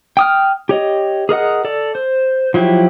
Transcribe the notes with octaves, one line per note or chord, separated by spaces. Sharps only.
G5 D#6 F6
G4 C#5 D#5
G#4 A#4 D#5 F#5
A4 D5
C5
F3 F#3 E4 G4